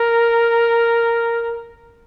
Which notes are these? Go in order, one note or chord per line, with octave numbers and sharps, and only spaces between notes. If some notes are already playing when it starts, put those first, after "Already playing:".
Already playing: A#4